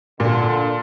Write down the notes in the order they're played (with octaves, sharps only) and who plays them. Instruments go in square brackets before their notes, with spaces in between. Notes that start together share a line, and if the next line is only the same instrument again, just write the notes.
[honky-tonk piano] A#2 [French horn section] D3